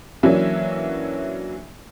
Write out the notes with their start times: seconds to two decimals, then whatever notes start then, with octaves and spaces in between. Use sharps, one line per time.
0.23 E3 F#3 A#3 C#4 D4 E5